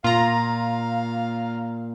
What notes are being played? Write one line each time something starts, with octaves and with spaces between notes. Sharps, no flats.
A#2 F4 F5 A#5